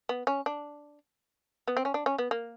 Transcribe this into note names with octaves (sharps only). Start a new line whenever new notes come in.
B3
C#4
D4
B3
C4
C#4
D4
C#4
B3
A#3